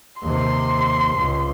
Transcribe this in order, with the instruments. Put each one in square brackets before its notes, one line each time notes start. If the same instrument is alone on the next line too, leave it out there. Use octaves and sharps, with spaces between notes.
[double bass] D#2 C3 [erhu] C6
[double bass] C#2